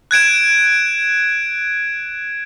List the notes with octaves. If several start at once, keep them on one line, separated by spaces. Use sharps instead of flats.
F#6 G#6 D7 E7